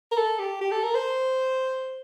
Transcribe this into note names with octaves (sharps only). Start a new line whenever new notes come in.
A#4
A4
G4
G4
A4
A#4
C5